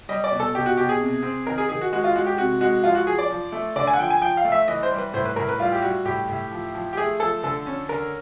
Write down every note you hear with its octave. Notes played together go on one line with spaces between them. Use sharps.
G3 D#5
D5
B2
A4
B2 G4
F#4
B2 G4
G#4
C3
C4
D#3 A#4
G#4
D#3 G#4
F#4
G#3 F#4
F4
G#3 F#4
G4
C3 F#4
G#3 F#4
F3 F4
F#4
F3 G#4
D5
F3
A3
D3 D5
G#5
F#5
F3 G5
G#5
F3 G5
F5
A3
E5
E3 D#5
C5
G3
B4
A2 C5
B4
A2 A#4
B4
G3 F4
G4
G3 F#4
A2 G4
A2
F3
F3
G4
A3 G#4
F3 A4
D3 A4
C#4
D3 A#4